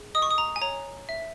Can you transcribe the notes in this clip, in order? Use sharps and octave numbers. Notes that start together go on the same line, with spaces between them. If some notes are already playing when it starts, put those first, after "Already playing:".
Already playing: G#4
D#5 D#6
C#6
D#6
A#5
G#5
C#5 A#5
E5